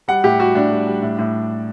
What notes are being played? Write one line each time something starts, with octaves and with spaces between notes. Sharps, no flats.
G3 F#5
A2 G4
G3 F#4
A2 D4
G3
G3
A2
A2